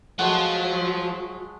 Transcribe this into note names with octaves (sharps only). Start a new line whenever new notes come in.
F3 F#3 G#3 A3 F#5